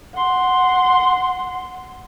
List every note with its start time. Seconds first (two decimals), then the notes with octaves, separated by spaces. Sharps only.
0.14 F#5 C6